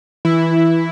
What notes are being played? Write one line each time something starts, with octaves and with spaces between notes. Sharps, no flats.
E3 E4
E3